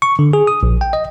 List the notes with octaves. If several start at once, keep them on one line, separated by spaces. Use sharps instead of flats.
C#6
D3
G#4
D#6
A#1
G5
D#5